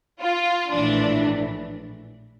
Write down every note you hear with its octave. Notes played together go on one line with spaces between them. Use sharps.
F4
A#1 A2 E3 D4